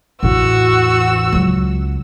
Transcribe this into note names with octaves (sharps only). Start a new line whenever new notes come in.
A1 E2 F#4 E6
C#2 F#3